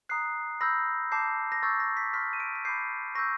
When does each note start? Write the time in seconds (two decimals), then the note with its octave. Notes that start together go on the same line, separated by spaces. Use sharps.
0.09 A#5 D#6 F#6 C7
0.61 B5 E6 G6 A#6
1.12 A5 D6 G6 C7
1.52 A#6
1.62 C#6 E6 G6 A6
1.80 A#6
1.97 B6
2.13 C6 F6 B6
2.33 D#7
2.40 D7
2.55 B6
2.65 B5 D6 G6 C7
3.15 C#6 E6 G6 A#6